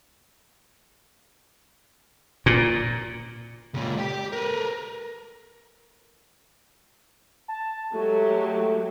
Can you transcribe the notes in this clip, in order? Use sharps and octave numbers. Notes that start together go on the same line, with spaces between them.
A#2
C#2 A#2
G4 G5
A#4 B4
A5
F#3 G#3 A3 G4